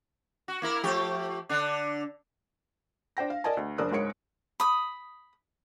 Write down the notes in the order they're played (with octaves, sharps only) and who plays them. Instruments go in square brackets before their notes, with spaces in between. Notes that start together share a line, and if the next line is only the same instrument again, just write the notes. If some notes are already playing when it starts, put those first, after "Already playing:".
[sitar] F#4
A#3 E4 A#4
F3 A3 G4
D3 D4
[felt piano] D4 C5 G5 A#6
F5
A#4 D5 D#5 G#5 A5
D2
F#1 D4 A#4 C5 D#6 F#6
C#2 G#2 A#4 C#5 C#7 D7
[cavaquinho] B5 D#6